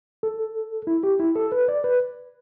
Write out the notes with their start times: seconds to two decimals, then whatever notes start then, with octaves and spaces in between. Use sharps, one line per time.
0.23 A4
0.87 E4
1.03 G4
1.20 E4
1.36 A4
1.52 B4
1.68 D5
1.84 B4